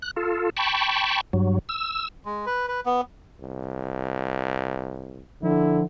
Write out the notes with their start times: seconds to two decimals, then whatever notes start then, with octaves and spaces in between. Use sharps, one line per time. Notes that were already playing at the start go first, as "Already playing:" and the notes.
0.02 F#6
0.16 F4 A4
0.57 G5 A5 B5 C#6
1.33 G2 F#3
1.69 E6
2.25 G#3
2.46 B4
2.68 B4
2.86 B3
3.41 C2
5.43 D3 F3 E4